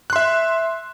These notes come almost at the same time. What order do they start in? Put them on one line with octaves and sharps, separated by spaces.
F#6 C6 E5